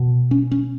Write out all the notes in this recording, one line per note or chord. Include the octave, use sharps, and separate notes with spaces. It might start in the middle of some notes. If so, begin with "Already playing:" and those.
Already playing: B2
C#4
C#4